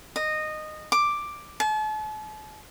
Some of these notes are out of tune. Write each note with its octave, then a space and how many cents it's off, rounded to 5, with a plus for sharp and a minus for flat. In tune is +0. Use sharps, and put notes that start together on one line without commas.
D#5 -15
D6 +5
A5 -40